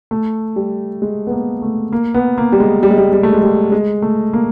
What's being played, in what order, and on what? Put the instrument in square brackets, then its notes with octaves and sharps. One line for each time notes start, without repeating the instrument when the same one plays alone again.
[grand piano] A3
G3
G#3
B3
A#3
A3
A#3
B3
A#3
G3
G#3
G3
G#3
G3
G3
A3
G#3
G3
G#3
A3
A#3